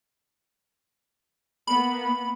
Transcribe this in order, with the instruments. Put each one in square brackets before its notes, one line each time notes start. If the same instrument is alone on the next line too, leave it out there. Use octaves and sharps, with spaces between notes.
[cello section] A#3 B3 [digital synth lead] B5